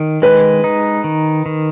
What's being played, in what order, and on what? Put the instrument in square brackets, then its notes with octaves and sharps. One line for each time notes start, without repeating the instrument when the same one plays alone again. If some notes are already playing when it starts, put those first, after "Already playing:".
Already playing: [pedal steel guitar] D#3
[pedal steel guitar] G#3 [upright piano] B4
[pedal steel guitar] D#4
D#3
D#3